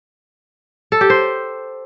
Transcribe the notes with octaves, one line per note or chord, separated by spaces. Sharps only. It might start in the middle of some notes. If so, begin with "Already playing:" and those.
A4
G4
C5